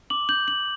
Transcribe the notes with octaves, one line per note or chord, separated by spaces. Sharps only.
D6 F#7
G6 F#7
G6 F#7